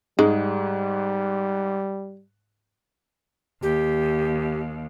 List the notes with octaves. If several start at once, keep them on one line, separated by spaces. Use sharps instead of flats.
G#2 G3 G#3
D#2 G4